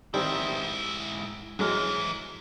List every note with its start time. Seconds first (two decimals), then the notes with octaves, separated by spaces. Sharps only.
0.14 G#2 D#3 G3 C4 E4
1.59 G#2 E3 F#3 G#3 F6